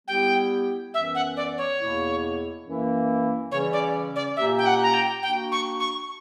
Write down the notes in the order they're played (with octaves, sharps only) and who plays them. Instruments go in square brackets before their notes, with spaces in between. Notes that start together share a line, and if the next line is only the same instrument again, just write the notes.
[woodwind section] G3 B3 E4 G4 [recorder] G5
[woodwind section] F#2 E3 B3 [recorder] E5
[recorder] F#5
D5
C#5
[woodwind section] E2 B2 A#3 E4
F#2 E3 A#3 E4
[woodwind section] C#3 E3 G3 C#4 [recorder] C#5
[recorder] D5
D5
[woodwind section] A#2 A#3 C#4 G4 [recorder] E5
[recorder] G5
F#5
A#5
G5
[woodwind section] A#3 D4 F#4 [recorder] G5
[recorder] C#6
C#6